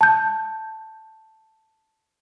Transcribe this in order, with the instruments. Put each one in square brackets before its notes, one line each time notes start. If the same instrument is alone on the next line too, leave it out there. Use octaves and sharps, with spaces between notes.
[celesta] A5 G6